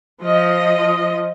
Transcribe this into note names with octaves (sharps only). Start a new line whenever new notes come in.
F3 D#5